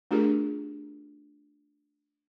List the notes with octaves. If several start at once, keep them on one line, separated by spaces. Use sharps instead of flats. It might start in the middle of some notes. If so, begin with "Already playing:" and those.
A3 D4 F4 G4 G#4 A#4